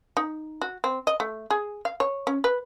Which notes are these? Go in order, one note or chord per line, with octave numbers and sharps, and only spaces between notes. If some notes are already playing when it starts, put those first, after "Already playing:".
D#4
F#4
C4
D#5
A3
G#4
F5
C#5
C#4
B4